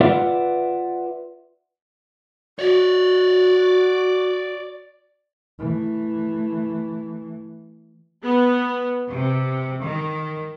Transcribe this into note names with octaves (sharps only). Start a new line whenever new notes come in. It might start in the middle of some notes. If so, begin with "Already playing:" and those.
F4 B4 D5 E5 F#5
F#4 C#5 D5
E3 A3
B3
C3
D#3